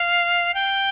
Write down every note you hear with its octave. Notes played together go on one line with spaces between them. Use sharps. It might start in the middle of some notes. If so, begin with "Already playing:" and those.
Already playing: F5
G5